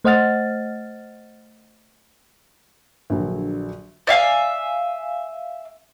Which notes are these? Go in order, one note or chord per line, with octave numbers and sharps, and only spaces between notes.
A3 C5 D#5 F#5 F6 A6
A#1 D3 F#3
D5 E5 F5 G#5